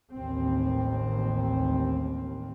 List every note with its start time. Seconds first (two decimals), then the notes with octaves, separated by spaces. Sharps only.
0.13 A1 D#2 C4